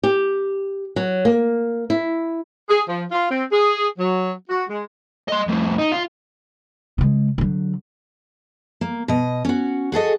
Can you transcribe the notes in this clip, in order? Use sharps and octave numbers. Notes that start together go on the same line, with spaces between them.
G4
F#3
A#3
E4
G#4
F3
F4
C4
G#4
F#3
F#4
G#3
D#5 C6
F2 A2
D#4
F4
C#3 G#3
D3 F#3
A#3
B2 D#5
C#4 F#4
F#4 G#4 A4 D#5